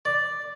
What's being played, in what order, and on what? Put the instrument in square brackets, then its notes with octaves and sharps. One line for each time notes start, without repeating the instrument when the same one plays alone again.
[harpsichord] D5